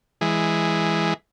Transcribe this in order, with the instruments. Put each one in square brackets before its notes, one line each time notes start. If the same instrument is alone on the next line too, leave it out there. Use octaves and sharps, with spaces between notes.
[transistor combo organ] E3 G#3